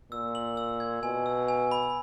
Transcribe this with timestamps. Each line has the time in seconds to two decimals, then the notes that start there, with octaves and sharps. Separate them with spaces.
0.11 A#2 E6
0.35 F#7
0.57 E6
0.80 G#6
1.03 B2 G#5
1.26 E6
1.48 G#5
1.71 B5